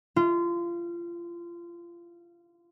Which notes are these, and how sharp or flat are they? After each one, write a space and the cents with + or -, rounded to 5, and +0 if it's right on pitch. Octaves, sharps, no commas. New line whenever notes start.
F4 -25